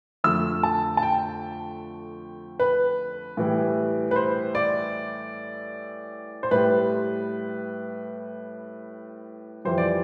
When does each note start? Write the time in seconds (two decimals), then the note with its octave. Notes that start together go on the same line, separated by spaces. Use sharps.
0.24 F2 D3 A3 E6
0.63 A5
0.97 A5
1.03 G5
2.60 B4
3.37 A2 E3 G3
4.11 B4
4.16 C5
4.55 D5
6.43 C5
6.51 A2 G3 B4
9.65 F2 E3 G3 C5
9.78 D5